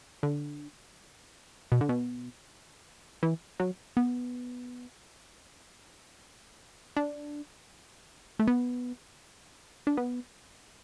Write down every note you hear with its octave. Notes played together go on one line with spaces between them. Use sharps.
D3
B2
D3
B2
E3
F#3
B3
D4
A3
B3
D4
B3